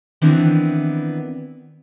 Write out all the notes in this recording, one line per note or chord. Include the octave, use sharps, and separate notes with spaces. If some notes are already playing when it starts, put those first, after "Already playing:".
D#3 E3 B3 C4 D4 E4